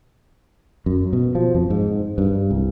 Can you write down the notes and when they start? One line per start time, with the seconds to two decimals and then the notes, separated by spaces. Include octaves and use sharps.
0.86 F#2
1.13 B2
1.35 F3
1.55 F2
1.70 G#2
2.18 G2
2.51 C2